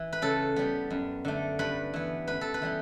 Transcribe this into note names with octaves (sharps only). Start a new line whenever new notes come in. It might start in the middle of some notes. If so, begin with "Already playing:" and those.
Already playing: E3
B4
C#3 A4
G3 B3
F#2
D3 A3
G2 B4
E3 B3
F#2 B4
A4
B4
E3 G3 B3